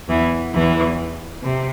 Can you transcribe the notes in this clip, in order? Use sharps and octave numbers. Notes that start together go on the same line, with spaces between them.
E2 E3
E2 E3
C3